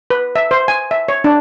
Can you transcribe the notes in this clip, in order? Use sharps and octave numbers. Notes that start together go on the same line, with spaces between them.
B4
E5
C5
G#5
E5
C#5
D4